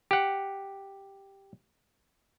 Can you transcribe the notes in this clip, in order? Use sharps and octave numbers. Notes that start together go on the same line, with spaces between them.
G4 F#5